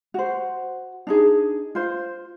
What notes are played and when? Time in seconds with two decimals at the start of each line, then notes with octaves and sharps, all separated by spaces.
0.14 F#4 C5
1.07 D4 D#4 G#4
1.75 F4 C5